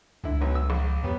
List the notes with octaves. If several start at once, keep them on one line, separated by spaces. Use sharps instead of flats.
C#2 D3 E4
B1 F#3
E6
A#1
E2 G3 B3 C#4